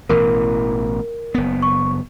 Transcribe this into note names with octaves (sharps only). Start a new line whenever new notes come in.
A1 B2 E3 A#4
F#1 B3
C#6